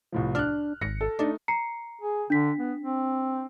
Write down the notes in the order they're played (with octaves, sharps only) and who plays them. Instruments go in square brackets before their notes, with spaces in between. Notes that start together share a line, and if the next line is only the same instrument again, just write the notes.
[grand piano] C2 A2 F3
[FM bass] D4 [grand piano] F6 F#6
[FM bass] G#1 [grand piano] A#6 C#7
[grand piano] A4
[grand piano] A3 D#4 [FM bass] D4
[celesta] A#5 C7 C#7
[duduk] G#4
[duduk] D3 [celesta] D4 B6
[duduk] B3
C4